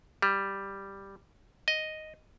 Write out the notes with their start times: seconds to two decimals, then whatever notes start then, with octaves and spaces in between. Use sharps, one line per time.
0.22 G3
1.68 D#5